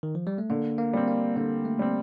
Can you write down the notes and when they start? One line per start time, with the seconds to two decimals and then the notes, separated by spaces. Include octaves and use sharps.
0.03 D#3
0.15 F3
0.27 G3
0.38 A3
0.50 D3 A#3
0.78 A#3
0.93 G3 C4
1.08 A#3
1.36 D3 A#3
1.65 A3
1.79 G3 C4